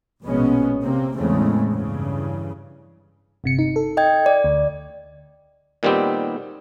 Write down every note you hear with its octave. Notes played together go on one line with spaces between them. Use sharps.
A#1 B2 G#3 B3 C#4
C3 A#3 C4
E2 A2 C#3 G#3 A3 C4
G2 C#3 E3
G1 C3 C#7
D#4
A4
D#5 G5 G#6
D5
D2
A#2 D#3 G3 B3 C4 G4